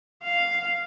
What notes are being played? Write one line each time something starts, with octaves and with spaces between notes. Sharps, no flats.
F5